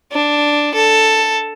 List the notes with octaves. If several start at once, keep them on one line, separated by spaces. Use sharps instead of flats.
D4
A4